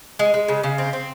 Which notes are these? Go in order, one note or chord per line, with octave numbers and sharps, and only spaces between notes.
G#3
G#3
C#3
C#3
C4
C4